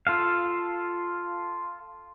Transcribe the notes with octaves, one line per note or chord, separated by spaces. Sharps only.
F4 A4 F5